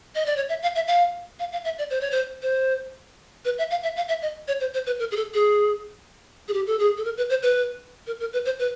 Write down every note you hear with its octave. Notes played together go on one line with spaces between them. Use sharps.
D#5
D5
C#5
E5
F5
E5
F5
F5
F5
E5
D5
C5
C#5
C5
C5
B4
E5
F5
E5
F5
E5
D#5
C#5
C5
C5
B4
A#4
G#4
A4
G#4
G#4
G4
A4
G#4
A4
A#4
B4
C5
B4
A#4
A#4
B4
C5
B4